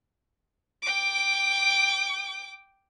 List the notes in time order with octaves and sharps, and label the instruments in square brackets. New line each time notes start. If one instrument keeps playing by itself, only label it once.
[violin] G5 D6